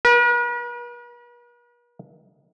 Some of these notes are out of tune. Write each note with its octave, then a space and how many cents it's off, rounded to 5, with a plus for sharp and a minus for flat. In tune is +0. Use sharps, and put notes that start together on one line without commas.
B4 -45